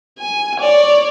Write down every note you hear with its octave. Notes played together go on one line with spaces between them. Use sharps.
G#5
C#5 D5